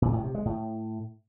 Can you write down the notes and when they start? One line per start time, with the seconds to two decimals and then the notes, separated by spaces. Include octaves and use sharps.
0.02 A#2
0.13 A2
0.24 C3
0.35 G#3
0.45 A2